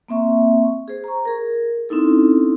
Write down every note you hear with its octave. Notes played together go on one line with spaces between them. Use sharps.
A#3 C4 E5 C#6
G#4 C5
A#5 C#6
G#4 A#4
C4 C#4 D#4 E4 A4